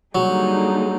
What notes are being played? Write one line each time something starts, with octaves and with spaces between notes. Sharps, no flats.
D3 F#3 G3 A#3 D#4 G#4